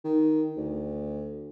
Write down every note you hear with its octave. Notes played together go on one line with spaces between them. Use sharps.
D#3
D2